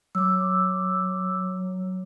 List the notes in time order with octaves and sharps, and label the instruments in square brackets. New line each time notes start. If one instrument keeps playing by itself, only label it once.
[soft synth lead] F#3 [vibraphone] D6 E6